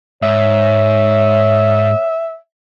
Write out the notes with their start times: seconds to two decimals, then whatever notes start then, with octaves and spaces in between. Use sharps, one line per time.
0.23 G#2 C#5 E5